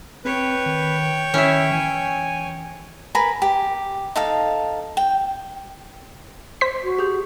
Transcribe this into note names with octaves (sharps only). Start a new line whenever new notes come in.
C4 B4 C#5 G5
D#3
D#3 C#4 E4 E5
E3 G#5
A#4 B4 G#5 B5
G4
D#4 A4 F5
G5
C5 B6
F#4
G4 G#4 G6